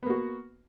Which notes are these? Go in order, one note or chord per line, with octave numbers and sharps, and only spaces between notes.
A#3 B3 F#4